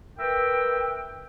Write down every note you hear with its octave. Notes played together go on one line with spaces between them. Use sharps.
A#4 B4 E5 G5